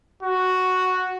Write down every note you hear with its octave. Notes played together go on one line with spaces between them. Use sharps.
F#4